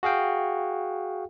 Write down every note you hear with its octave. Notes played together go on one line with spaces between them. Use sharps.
F#4 G#4 F5 G5